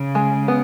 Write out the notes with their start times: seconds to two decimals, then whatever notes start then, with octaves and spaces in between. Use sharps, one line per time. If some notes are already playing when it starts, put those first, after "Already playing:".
Already playing: C#3
0.15 G#3
0.48 B3